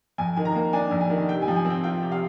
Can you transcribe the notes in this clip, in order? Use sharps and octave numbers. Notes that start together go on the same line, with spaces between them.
F2 G#5
D#3 G#5
A#5
A#3
D4 G#5
F2
G#5
D#3
C3 G5
G#5
F3
G#5
C4 G5
F4 G5
C3
F5